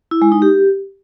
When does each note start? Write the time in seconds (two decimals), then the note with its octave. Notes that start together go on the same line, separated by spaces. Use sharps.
0.11 E4
0.22 G#3
0.32 D#4
0.42 G4